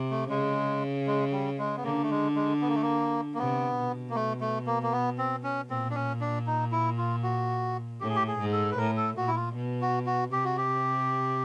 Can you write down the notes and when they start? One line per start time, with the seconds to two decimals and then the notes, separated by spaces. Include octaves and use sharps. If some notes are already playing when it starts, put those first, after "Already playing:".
Already playing: C3
0.11 A3
0.29 C#3 G#3
1.07 G#3
1.32 G3
1.58 G#3
1.77 B3
1.84 D3 A#3
2.03 A3
2.10 G#3
2.35 G#3
2.61 B3
2.68 A#3
2.75 A3
2.82 A#3
3.34 A#3
3.38 C3 B3
3.77 B2
4.10 A#3
4.15 A3
4.41 A3
4.67 A#3
4.83 A#3
4.92 B3
5.18 C4
5.43 C#4
5.70 A#2 C4
5.91 D4
5.95 C#4
6.21 D4
6.47 D#4
6.72 E4
6.98 F4
7.23 F#4
8.00 A2 G4
8.09 G#4
8.16 G4
8.27 G#4
8.39 G#2
8.52 A4
8.71 B4
8.78 A2 A#4
8.97 A4
9.17 A#2 F#4
9.28 E4
9.36 F4
9.55 B2
9.81 F#4
10.06 F#4
10.32 C3 G4
10.44 F#4
10.57 G4